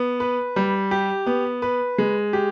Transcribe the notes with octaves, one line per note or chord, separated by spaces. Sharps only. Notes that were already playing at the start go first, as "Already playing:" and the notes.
Already playing: B3
B4
G3
G4
B3
B4
G#3
G4